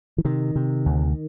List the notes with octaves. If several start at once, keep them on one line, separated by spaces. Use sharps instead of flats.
E3
C3 D#3
C3
D2